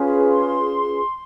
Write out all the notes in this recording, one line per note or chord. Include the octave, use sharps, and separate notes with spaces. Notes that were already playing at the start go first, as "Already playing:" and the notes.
Already playing: C#4 F4 G#4 B4
C6